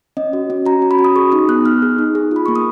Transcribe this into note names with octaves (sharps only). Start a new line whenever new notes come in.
C#4 D#5
F#4
C#4
F#4 A#5
C#4
B5
F#4
D#6
G#4 C#6
D#4 D#6
B3 F#6
B3 F6
G#4
D#4
G#4
F4 B5
A#3 C#6
D#6